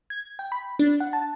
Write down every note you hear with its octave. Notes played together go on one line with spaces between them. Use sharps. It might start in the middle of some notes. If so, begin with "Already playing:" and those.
G#6
G5
B5
D4
F#5
A5